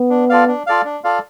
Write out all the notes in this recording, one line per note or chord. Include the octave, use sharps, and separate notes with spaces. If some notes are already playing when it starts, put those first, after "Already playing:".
Already playing: B3
D4
F4 A4 D5 F5
D4
F4 A4 D5 F5
D4
F4 A4 D5 F5